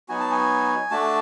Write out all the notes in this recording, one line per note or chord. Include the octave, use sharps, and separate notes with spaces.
F#3 B3 D#4 F#4 G#5
A5
G#5
A3 D4 F#4 A5